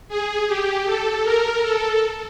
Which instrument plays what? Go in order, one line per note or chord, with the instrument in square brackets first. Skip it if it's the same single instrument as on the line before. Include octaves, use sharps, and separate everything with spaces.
[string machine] G#4
G4
A4
A#4
A4